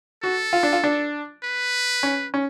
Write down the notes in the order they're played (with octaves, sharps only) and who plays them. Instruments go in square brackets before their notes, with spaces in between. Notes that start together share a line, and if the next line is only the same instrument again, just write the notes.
[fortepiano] F#4 [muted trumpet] A4
[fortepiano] F4
D4
F4
D4
[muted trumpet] B4
[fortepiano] C#4
C#4